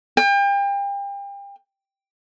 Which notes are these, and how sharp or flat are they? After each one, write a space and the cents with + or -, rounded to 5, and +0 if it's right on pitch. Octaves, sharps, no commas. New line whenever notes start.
G5 +35